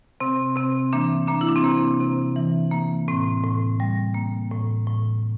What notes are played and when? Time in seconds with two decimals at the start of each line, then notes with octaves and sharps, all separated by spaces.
0.20 C3 C4
0.56 C3 C4
0.93 E3 A#3 D4
1.28 A#3 D4
1.41 E4
1.48 D4
1.56 C4
1.64 C3 A#3
2.00 C3
2.36 E3
2.72 A#3
3.08 A2 C4
3.44 A2
3.80 G3
4.15 A#3
4.51 A2
4.87 A2